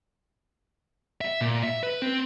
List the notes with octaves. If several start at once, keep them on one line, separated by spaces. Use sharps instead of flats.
E5
A#2
E5
B4
C4